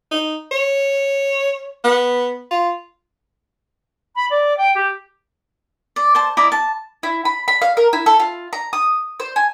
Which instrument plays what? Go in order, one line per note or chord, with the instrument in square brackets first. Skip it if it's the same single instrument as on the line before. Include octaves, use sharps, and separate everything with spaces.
[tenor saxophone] D#4
C#5
B3
F4
[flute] B5
D5
G5
G4
[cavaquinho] D5
C5 A5
E4 D5 D#5 A#5
A5
[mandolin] E4
B5
B5
F5
A#4
E4
A4
F4
A#5
D#6
C5
G#5